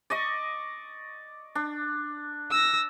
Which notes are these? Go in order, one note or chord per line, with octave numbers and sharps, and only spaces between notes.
D5 D#5 C#6
D4
E6 A#6